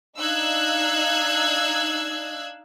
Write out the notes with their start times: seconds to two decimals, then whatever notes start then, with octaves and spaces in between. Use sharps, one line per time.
0.18 D4 D#4 F5 E6 F#6 G#6